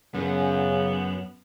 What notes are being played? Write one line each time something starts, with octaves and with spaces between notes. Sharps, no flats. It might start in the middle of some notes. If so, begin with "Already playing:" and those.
F#2 C#3 B3